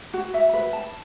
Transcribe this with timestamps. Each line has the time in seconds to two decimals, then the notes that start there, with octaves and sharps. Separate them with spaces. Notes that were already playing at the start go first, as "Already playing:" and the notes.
0.14 F#4
0.34 E5
0.53 B4
0.73 A5